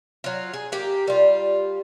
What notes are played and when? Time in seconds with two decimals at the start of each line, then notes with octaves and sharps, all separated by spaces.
0.24 F#3 F4
0.53 G#4
0.72 A#3 G4
1.08 G3 F4